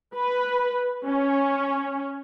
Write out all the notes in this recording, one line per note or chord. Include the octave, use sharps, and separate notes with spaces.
B4
C#4